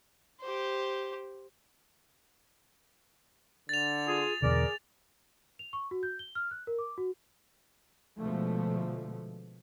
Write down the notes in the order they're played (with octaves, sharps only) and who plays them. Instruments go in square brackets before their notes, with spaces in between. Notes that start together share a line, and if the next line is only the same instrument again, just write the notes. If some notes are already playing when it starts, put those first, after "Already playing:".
[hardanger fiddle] G4 C5
[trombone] D3 [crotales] A6 F7
[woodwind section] F4 G#4
[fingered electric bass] E2 B2 D3 [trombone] G#4 [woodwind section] A#4 D5
[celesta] F7
C#6
F#4
G6
G7
F6
F#6
A#4
D6
F#4
[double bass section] B2 D3 F3 G#3 A3